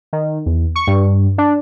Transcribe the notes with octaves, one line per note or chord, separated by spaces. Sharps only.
D#3
E2
C#6
G2
D4